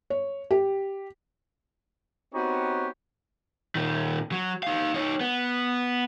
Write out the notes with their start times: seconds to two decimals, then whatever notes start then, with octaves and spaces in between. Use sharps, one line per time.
0.10 C#5
0.51 G4
2.34 B3 C4 D#4 F#4 G4 C#5
3.75 A#2 D#3
4.32 F#3
4.63 D#4 F5
4.95 D#4 C#5
5.20 B3